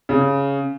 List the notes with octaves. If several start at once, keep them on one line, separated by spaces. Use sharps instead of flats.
C#3